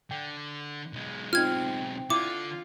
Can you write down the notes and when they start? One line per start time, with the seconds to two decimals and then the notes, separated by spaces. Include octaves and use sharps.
0.11 D3 G5
0.93 B1 G#3
1.33 C4 D#4 F4 F6 G#6
2.10 D3 E4 F4 D6 G#6